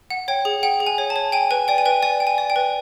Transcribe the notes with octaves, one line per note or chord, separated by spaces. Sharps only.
F#5
C#5 G5
G#4
F#5 G5
G#4
G#5
C#5
A5
C#5
G5 G#5
B4 G#5
D5 G5
G#5
B4 G5
D5 G#5
G5
G#5
D5
G5
B4